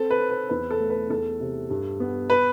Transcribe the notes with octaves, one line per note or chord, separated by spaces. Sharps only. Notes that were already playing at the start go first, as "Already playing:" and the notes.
Already playing: C4 A4
B4
C4
B4
E2 B4
A4
A3
B4
E2 A4
C3
G2
B3
B4